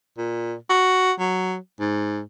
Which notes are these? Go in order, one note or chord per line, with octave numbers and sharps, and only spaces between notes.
A#2
F#4
F#3
G#2